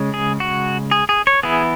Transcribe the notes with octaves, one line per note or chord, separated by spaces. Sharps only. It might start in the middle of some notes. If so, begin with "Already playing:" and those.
Already playing: C#3 G#3 C#4
G#4
F#4
G#4
G#4
C#5
E3 B3 E4 G#4